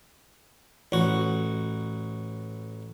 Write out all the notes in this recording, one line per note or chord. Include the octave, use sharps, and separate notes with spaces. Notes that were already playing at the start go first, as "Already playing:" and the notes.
A1 F#4